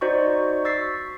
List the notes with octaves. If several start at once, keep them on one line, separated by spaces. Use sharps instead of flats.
D#4 F#4 C5 D5 D#5 C#6
C#6 E6 A6 B6 C7